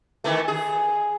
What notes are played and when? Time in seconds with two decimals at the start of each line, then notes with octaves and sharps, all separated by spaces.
0.24 D#3 E3 A3
0.48 G#4